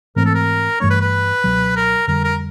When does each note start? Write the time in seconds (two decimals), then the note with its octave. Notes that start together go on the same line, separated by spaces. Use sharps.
0.16 G#2 E3 A3 C4 A#4
0.25 A4
0.35 A#4
0.80 G2 E3 A3 D4 C#5
0.90 B4
1.02 B4
1.44 C#2 B2 F#3
1.76 A#4
2.07 F2 D3 G3 A#4
2.24 A#4